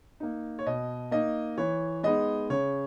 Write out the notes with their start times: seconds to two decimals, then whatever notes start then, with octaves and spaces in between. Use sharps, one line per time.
0.20 A#3 D#4
0.59 C#5
0.66 B2 D#5
1.11 A#3 D#4 D#5
1.57 E3 C#5
2.03 G#3 B3 D#4 D#5
2.50 C#3 C#5